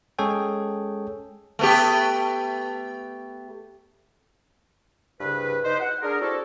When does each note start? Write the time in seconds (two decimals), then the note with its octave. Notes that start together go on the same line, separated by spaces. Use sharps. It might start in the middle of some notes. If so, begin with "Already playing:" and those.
0.19 G#3 C#4 G#4 A4 C#5 G5
1.59 A3 B3 G4
5.20 C2 G2 C#3 B4
5.65 D#4 B4 C5
5.80 F#5
6.02 D4 G#4 A#4
6.21 C4 D4 E4 F#4 A4